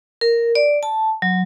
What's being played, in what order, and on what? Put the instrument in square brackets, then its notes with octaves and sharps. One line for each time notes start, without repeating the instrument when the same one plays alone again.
[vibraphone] A#4
D5
A5
F#3